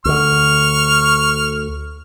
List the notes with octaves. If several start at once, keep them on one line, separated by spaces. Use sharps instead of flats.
D2 D3 C#6 F6